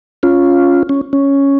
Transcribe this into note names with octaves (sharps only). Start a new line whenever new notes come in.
C#4 F4
C#4
C#4